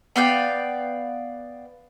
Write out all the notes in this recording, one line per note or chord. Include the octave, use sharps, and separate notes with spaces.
B3 D5 F5 G5